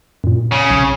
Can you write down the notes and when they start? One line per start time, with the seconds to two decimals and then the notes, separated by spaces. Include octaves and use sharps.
0.24 F#2 A#2
0.51 C#3
0.70 B1